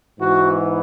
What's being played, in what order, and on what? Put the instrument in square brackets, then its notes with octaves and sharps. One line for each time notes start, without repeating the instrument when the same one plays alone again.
[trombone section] G#2 E3 B3 F#4